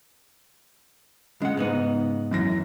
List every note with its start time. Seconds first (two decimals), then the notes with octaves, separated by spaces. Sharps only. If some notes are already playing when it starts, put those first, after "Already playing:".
1.42 C#3 G#3 F#5
1.57 G#2 B3 D#4
2.31 F#2 E3 A#6